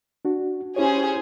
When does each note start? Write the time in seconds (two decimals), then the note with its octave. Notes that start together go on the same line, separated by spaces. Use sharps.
0.25 D4 F#4
0.76 C#4 E4 G4 G#4 C5 C#5